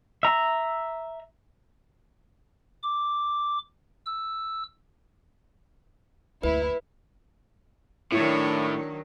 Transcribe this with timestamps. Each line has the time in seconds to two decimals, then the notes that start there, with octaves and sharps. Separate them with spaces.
0.23 E5 A#5
2.83 D6
4.06 E6
6.43 F#1 D2 E4 B4
8.12 A2 D#3 F#3 D4 E4 C#5